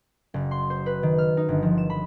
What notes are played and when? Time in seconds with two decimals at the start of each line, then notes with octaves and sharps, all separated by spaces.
0.34 F#1
0.51 C6
0.70 C5
0.86 B4
1.03 D#3
1.18 F6
1.37 D#4
1.49 G1
1.62 F3
1.78 E7
1.90 B5